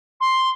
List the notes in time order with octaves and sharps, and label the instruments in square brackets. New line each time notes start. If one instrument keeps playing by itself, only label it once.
[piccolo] C6